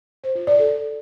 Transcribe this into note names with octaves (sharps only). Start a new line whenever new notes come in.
C5
F4
D5
A4